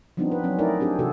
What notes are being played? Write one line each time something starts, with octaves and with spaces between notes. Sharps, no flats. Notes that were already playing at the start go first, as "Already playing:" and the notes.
F3 G3 B3 C4 D4 D#4
B4
F#3 C4 C#4
A3 D#4 E4 A#4 D5
C4 D4 G4 G#4
C3 E3 F#4 G#4 A4